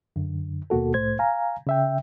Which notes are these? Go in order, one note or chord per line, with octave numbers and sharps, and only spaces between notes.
F#2 D3
D#2 B2 A#3 F#4 A4
C2 A2 A3 C5 G#6
F5 G#5 A#5
C#3 E5 G5